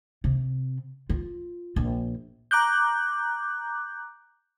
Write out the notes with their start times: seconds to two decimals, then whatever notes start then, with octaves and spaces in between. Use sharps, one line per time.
0.24 C3
1.10 F4
1.76 A#1
2.51 A#5 D6 F#6 G6